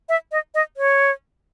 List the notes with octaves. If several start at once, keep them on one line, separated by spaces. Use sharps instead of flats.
E5
D#5
D#5
C#5